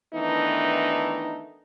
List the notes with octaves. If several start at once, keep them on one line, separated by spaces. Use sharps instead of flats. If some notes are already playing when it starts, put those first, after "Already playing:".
D#3 E3 A3 B3 D4 D#4